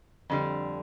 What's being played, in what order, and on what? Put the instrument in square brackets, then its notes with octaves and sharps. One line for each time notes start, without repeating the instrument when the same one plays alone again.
[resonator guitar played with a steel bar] F2 D3 G3